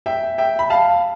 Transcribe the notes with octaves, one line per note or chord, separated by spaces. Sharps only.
E5 G5
E5 G5
B5
F5 A5